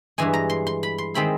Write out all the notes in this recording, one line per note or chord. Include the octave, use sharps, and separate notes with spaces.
G2 E3 G#3 G#5
A#5
C6
C6
B5
C6
D#3 G#3 C4 E4 B5